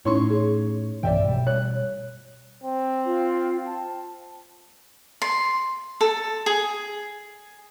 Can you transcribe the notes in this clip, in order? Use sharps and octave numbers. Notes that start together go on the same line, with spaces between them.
A2 C#4 D#4 E4 C#5 C6 C#6
G#4
B1 G2 E3 D5 E5 G5
B2 G3
C#5 F#6
C4
F4
A5
C6
A4
G#4